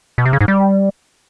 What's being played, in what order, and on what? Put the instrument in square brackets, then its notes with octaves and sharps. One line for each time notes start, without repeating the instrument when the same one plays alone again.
[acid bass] B2
C3
C#3
G#2
G3